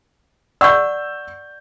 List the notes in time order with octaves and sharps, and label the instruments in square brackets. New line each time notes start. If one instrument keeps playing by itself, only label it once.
[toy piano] D5 F#5 C#6 [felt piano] E6 G6